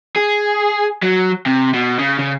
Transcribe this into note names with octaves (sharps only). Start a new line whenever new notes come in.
G#4
F#3
C3
B2
C#3
C#3